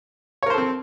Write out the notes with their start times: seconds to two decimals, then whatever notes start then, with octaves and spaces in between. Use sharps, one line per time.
0.43 C#5
0.46 A#4
0.50 C5
0.54 A4
0.58 C4